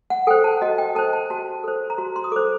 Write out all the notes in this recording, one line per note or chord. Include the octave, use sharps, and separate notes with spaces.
F#5
A4 C5 G5
A5
F#4 D#5
G5
A4 C5 A5
A5
F#4 A5
A4 C5
A#5
F#4 C6
C6
D#6
A4 C5 D6